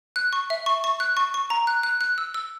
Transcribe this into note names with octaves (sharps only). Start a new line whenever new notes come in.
F#6
C#6
E5
C#6
C#6
F#6
C#6
C#6
A#5
F#6
F#6
F#6
E6
E6